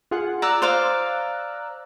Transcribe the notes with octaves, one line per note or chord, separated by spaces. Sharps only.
F4 G#4 F#5
D5 A#5 E6 F#6
C5 D5 F5